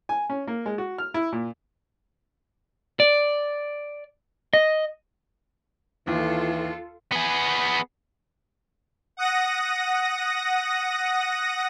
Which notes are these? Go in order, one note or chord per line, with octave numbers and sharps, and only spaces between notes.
G#5
C#4
A#3
G#3
F#4
F6
E4
A#2
D5
D#5
D#2 E3 F4 A4
B3 G#4
F#5 D#6 A#6